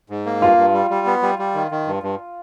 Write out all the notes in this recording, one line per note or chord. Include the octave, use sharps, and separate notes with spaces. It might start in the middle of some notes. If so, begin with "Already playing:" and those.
G#2
A#3
G2 F4
G2
G3
G3
B3
G3
G3
D#3
D#3
G2
G2